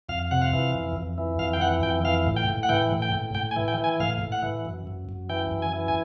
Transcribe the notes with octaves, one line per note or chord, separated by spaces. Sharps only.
F2 F5
C3 F#5
F5
E3
F2
F2
E3
F2 F5
G5
E3 F#5
F2 G5
E3 F5
A2
G5
A2
F#5
E3 G5
A2
G5
A2
A2 G5
G#5
E3
G5
E3
G#5
A2 F5
A2
F#5
E3
F#2
F#2
F#2
E3 G5
F#2
G#5
E3
G#5